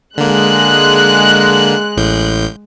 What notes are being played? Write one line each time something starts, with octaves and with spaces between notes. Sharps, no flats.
D3 G#3 A#3 F#6
A1 A2 G6